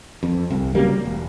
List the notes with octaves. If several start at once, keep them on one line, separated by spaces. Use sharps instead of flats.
F2
C2
C#3 F#3 G3 A#3
E1